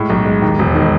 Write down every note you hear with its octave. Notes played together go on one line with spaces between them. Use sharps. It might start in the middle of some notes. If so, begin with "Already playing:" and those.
Already playing: A2 G#3
B1
G#3
D#2
E1
D#3